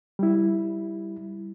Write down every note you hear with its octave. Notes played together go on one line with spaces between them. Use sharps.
G3 E4